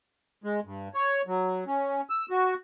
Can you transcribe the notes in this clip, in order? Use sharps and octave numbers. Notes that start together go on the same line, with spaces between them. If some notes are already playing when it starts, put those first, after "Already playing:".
G#3
G2
C#5
F#3
C#4
E6
F#4